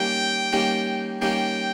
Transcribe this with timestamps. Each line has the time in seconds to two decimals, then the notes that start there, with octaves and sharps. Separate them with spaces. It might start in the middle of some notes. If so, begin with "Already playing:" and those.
Already playing: D#3 G3 A#3 C#4 G5
0.53 D#3 G3 A#3 C#4
1.21 D#3 G3 A#3 C#4 G5